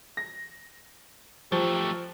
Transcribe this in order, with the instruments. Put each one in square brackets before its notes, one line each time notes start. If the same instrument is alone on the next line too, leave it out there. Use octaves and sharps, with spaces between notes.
[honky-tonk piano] A#6
[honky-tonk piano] F3 [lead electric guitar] F#3 A3 [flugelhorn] G4